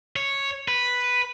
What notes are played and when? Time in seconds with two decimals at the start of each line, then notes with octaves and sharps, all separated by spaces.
0.16 C#5
0.68 B4